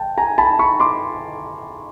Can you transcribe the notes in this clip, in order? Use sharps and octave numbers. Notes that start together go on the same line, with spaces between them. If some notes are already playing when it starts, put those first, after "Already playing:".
Already playing: G5 A5
G#5 A#5
A5 B5
B5 C#6
C6 D6